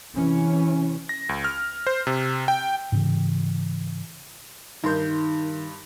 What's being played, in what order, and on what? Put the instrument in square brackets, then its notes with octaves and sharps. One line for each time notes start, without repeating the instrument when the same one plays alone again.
[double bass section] C3 E3 C#4
[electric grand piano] A#6
C#2
F6
C5
C3
G5
[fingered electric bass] G#2 C#3 E3
[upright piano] G2 C6 G6 [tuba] D#3 [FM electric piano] D#4 A#4